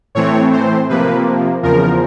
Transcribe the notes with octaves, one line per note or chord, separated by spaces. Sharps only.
A2 E3 A3 C4 C#5
C5
C3 F3 A#3 B4
E2 C#3 F3 A#4